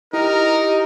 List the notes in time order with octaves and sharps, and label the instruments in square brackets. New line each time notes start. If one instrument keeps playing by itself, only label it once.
[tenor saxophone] D#4 [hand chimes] E4 [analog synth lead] G4 [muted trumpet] A#4